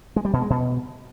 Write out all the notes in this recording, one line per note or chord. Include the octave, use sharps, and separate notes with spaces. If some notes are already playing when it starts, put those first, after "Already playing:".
G#3
G3
B2
G#3
B2